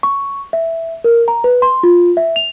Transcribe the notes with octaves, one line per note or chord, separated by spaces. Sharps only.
C#6
E5
A#4
A#5
B4
C6
F4
E5
F7